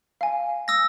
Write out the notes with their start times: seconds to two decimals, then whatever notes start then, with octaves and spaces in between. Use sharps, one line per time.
0.21 F5 G#5
0.68 D#6 E6 A#6